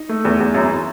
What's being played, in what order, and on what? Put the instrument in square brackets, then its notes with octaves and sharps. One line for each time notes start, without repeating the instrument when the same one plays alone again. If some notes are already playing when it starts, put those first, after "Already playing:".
Already playing: [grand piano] D#4
[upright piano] A3
E2
E2
[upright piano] F#2 [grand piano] E4